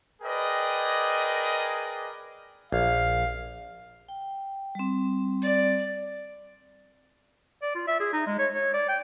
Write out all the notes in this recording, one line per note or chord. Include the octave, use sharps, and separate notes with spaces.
G#4 A#4 B4 D5 D#5 G5
A#1 F5
G5
G3 C4
D5
D5
F4
E5
G#4
D#4
G#3
C#5
C#5
D5
G5